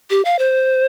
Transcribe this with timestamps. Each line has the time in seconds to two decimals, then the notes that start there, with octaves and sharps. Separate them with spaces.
0.10 G4
0.25 F5
0.39 C5